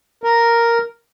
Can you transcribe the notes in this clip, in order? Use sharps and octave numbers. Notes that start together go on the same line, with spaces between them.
A#4